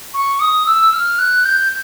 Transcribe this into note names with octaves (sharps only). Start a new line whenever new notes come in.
C#6
D#6
E6
F6
F#6
G6